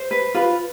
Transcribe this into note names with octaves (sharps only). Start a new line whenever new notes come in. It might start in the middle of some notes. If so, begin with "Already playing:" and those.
Already playing: C5
B4
F4 B4